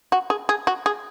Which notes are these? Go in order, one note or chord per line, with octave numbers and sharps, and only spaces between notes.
F#4
G#4
G#4
F#4
G#4